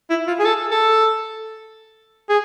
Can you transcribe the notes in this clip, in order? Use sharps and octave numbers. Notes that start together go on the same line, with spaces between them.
E4
F4
G#4
A4
A4
G#4